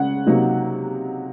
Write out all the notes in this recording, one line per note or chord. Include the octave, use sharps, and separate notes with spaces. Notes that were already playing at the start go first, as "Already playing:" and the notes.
Already playing: C#3 G#3 C#4 F#5
C3 F#3 A#3 D#4